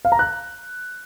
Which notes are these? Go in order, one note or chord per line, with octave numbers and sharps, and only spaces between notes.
F5
A#5
F#6